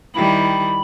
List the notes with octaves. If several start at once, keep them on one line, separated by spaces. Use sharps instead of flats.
D#3 G3 E4 B5